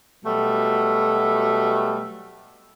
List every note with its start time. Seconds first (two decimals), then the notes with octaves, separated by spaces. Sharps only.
0.24 B2 F#3 G3 A3